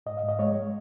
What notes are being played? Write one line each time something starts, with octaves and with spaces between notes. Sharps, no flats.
G#2 D#5
F5
G#2
D#5
G#3 C#5